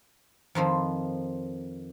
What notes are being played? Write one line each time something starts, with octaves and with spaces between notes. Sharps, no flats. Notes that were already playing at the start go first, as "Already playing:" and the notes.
F2 D#3 F3 B5